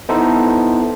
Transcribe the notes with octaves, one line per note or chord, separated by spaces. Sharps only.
B3 D#4 E4 A4 C5